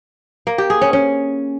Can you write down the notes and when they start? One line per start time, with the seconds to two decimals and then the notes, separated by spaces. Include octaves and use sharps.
0.47 A#3
0.58 G4
0.70 G#4
0.81 C#4
0.93 C#4